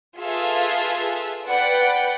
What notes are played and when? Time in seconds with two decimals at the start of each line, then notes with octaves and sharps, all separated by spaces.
0.20 F4 G#4 A4 B4 E5
1.46 B4 D5 F#5 G5